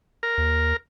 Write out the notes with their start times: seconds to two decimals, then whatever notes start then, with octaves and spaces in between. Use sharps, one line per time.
0.23 A#4
0.38 D#2